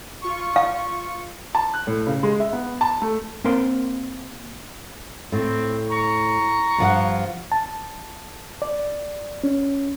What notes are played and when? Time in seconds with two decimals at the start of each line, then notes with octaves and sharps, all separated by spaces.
0.22 F4 C#6
0.56 F5
1.55 A5
1.74 F#6
1.87 A2
2.07 C#3
2.23 G#3
2.40 E5
2.53 B3
2.81 A5
3.02 A3
3.44 A#3 C4 A#4 C6
5.32 A2 C4
5.90 A#5 C#6
6.78 G2 F3 F#5
7.52 A5
8.62 D5
9.44 C#4